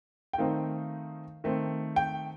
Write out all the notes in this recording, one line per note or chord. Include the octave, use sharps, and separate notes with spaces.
G5
D#3 A3 C4 D#4 F5
D#3 A3 C4
G5